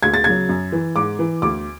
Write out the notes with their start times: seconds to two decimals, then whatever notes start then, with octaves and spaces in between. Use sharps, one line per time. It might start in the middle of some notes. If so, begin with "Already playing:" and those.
0.03 D2 G#6
0.14 A6
0.24 C#3 F#3 G#6
0.49 F#2
0.72 E3
0.96 G#2 D6
1.19 E3
1.42 D2 D6